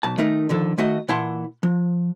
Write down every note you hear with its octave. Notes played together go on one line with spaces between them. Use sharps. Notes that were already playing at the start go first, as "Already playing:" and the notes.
B1 A5
D#3 A3 D#4 A#4
D3 D#3 F3 A4
D#3 A3 F#4 D#5
A#2 E3 E4 F#5 A5 C6
F3